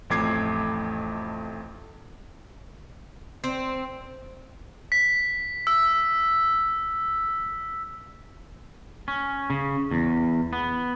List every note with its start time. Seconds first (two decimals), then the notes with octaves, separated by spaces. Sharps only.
0.10 A1 F2 A3 D6 G#6 C7
3.44 C4
4.92 B6
5.67 E6
9.08 C#4
9.50 C#3
9.91 E2
10.53 B3